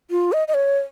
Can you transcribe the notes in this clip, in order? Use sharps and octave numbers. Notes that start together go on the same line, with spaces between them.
F4
D#5
D#5
C#5